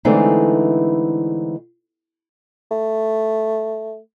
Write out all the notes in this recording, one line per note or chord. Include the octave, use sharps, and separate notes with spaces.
D3 E3 G#3 A3 C4 D#4
A3